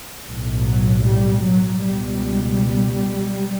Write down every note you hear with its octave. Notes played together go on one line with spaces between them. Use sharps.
B1 A2
F#3
G3
F#3
C#2 B2 G3